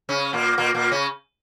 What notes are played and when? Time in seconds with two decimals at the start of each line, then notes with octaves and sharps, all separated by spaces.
0.09 C#3 C#4
0.33 A#2 A#3
0.58 A#2 A#3
0.74 A#2 A#3
0.91 C#3 C#4